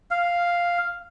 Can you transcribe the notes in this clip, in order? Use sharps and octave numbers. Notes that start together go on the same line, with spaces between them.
F5